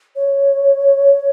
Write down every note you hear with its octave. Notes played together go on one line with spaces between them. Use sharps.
C#5